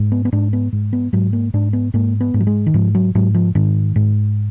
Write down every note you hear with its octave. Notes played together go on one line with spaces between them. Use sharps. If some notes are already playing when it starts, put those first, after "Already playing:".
Already playing: G#2
B3
B3
G#2 D4
B3
G#2
B3
G#2 F#3
A#3
G#2 D4
B3
G#2 A#3
B3
G#2
F#3
G#3
D#3
G#2 F3
F#3
G#2 F#3
F3
G#2 D#3
G#2